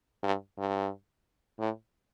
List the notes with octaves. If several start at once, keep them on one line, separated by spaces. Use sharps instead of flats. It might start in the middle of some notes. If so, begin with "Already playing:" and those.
G2
G2
A2